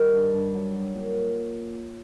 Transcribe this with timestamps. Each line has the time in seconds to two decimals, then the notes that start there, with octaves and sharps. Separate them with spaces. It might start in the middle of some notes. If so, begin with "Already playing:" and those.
Already playing: D#3 G3
0.13 G2
0.34 G2
0.54 F#3
0.74 F#3
0.95 A#2